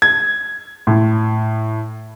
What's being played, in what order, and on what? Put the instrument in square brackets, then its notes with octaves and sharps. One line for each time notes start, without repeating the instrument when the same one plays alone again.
[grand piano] G#6
A2